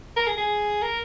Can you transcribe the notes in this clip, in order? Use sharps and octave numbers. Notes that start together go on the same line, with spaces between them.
A#4
G#4
G#4
A#4